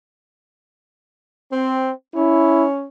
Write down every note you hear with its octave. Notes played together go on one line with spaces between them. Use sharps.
C4
C#4 E4